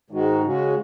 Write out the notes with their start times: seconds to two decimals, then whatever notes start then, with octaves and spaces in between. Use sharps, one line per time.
0.10 G#2 D#3 G#3 D#4 F#4
0.43 C#3 G#3 C#4 F#4